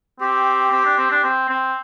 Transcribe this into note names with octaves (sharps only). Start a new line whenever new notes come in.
C4 G4
C4
D4
C4
D4
C4
C4